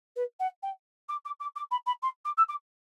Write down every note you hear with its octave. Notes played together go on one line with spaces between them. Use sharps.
B4
F#5
G5
D6
D6
D6
D6
B5
B5
C6
D6
E6
D6